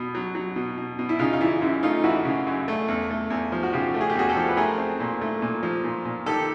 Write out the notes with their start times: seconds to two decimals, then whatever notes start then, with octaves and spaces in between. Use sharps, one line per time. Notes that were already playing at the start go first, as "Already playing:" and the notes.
Already playing: B2 B3
0.15 F#3
0.35 F#3
0.56 B2
0.78 B2
0.99 B2
1.09 E4
1.19 C#3 D#4 F4
1.33 F4
1.41 E3 E4
1.61 F#2 E4
1.83 A3 D#4 F4
2.04 E3 E4 F#4
2.25 C#3
2.47 F#2
2.68 A3
2.88 E2
3.10 A3
3.30 E2
3.52 F3
3.63 F#4
3.72 C#3 F4 G4
3.94 A3
4.01 G#4
4.10 G4
4.15 E2 F#4 G#4
4.29 G4 A4
4.37 F3
4.49 B4
4.57 A3 G#4 A#4
4.78 C4
5.00 A#2
5.21 A3
5.42 A#2
5.63 F3
5.84 A#2
6.05 A#2
6.26 D#3 G4 A4